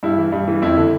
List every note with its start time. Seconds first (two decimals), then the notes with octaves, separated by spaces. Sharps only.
0.03 G2 E4
0.18 E3
0.32 G2
0.48 E3
0.62 F2 E4
0.77 D3